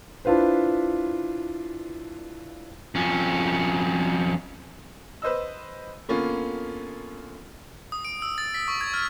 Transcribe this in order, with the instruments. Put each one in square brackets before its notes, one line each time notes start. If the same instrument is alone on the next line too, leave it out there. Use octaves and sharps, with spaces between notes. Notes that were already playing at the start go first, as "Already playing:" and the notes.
[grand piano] D4 E4 F4 B4 C5
[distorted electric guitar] F2 C#4
[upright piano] B4 C5 D#5 E6
D3 A#3 B3 C#4 F4
[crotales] D#6
D7
E6
A6
B6
C#6
G#6
F6